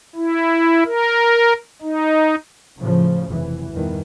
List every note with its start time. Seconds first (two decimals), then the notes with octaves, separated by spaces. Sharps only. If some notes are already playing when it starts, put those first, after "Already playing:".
0.16 E4
0.85 A#4
1.82 D#4
2.79 A2 C#3 F3
3.30 F1 E3
3.72 E2 G2 D#3 E3